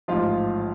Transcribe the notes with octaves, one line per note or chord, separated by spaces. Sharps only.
A1 G#2 F3 F4 F5